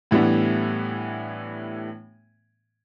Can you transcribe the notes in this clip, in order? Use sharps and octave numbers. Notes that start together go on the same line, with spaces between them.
A2 E3 G3 B3 D4